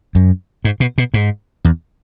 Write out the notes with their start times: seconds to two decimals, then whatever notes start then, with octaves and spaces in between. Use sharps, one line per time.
0.15 F#2
0.65 G#2
0.80 B2
0.98 B2
1.14 G#2
1.65 E2